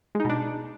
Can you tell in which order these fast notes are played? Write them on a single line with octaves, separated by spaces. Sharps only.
G#3 D#4 B2 D4